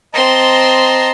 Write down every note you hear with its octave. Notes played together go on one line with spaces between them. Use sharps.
C4 D#5 A5 A#5 C6